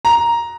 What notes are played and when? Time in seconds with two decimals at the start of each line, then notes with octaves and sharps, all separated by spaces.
0.05 A#5